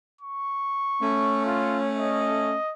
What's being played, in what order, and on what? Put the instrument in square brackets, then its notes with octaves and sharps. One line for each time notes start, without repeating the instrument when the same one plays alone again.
[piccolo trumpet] C#6
[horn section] A3 C#4
[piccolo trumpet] F4
D#5